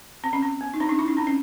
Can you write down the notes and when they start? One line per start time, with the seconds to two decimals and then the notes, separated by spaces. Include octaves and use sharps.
0.24 C4
0.33 C#4
0.42 C4
0.61 B3
0.74 D#4
0.80 C4 D4
0.89 C#4 D#4
0.99 D4 E4
1.08 C#4 D#4
1.17 C4 D4
1.27 C#4